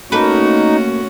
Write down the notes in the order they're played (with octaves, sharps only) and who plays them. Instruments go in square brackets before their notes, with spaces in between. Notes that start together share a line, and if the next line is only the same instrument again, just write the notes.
[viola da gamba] A3 C#4 F#4 [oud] A#3 A4 B4 [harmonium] D#4